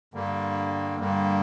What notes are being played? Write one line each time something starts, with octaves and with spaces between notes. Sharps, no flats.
G2 D3 G3 A#3
G2 D3 G3 A#3